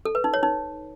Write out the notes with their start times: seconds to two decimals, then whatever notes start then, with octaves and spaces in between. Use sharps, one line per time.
0.05 A4
0.15 B4
0.24 D#4
0.34 C#5
0.43 D#4